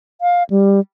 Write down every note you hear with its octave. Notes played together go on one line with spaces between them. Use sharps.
F5
G3